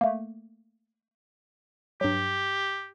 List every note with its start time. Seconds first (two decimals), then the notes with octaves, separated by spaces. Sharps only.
0.01 A3 A#3
2.01 G2 F#3 G4